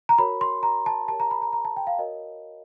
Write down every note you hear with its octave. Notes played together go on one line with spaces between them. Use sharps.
A#5
F#4 A#4 C#5 B5
C6
A#5
A5
G4 A#4 C#5 A5
A#5
B5
A#5
A#5
A5
G5
F5
F#4 A#4 C#5 D#5